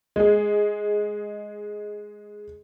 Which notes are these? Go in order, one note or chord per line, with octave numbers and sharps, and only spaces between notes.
G#3 G#4